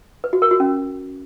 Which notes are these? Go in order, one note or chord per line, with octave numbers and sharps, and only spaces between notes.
B4
F#4
A#4
F#4
C#4